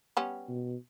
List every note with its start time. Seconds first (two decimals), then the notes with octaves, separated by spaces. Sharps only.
0.17 G3 B3 C#4
0.48 B2